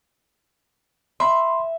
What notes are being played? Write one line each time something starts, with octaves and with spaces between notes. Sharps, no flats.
E5 B5 C6